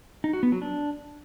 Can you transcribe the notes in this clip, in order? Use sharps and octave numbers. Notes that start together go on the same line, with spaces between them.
D#4
F#4
B3
F#3
D4